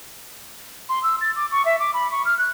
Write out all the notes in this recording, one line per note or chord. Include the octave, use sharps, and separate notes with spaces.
C6
E6
A6
D6
C#6
E5
D6
B5
C#6
F6
F#6